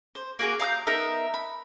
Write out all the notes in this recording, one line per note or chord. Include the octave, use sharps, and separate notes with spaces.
C5
A#3 F#4 G#4 A#4
F5 A#5 D#6 G6
B3 D#4 A#4 E5
B5